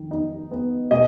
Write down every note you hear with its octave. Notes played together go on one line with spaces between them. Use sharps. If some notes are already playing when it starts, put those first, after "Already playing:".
Already playing: F2 D#3
D#4
B3
B2 D#5